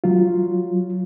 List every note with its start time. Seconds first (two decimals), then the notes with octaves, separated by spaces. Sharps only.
0.04 F#3 F4